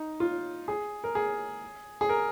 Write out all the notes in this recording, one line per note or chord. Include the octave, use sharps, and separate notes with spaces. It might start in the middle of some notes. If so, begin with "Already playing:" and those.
Already playing: D#4
F4
G#4
A#4
G#4
G#4
A#4